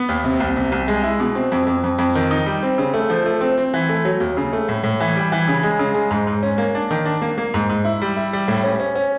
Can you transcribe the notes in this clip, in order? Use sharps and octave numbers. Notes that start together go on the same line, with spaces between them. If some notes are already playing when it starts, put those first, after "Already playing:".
Already playing: B3
D#2
C3
C2
C3
C2
G#3
E4
B2
C4
F2
F2
F2
F2
D#3
D#4
G3
C4
C#3
A3
F3
A3
C4
C4
E3
A3
F#3
D#2
C#3
A3
A2
A2
E3
G3
E3
C#3
G#3
C#3
G#3
G#2
G#2
C#4
A#3
D4
D#3
D4
A#3
A#3
G#2
G#2
E4
G3
E4
G3
A2
C#4
C#4
C#4